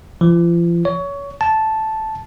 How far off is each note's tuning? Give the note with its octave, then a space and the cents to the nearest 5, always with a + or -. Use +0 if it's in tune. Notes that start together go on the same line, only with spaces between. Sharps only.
F3 -40
C#5 +25
A5 -5